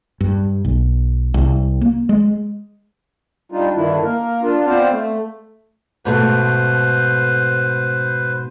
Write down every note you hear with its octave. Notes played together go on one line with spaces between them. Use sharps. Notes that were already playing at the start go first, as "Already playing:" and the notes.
G2
B1
C2
A#3
G#3
G3 D4 D#4 F4
G2 D3 D#3 D4 E4
A#3 A#4
D4 F4
B3 C4 C5 D5 F5
A3
G#2 B2 A3 B4 C5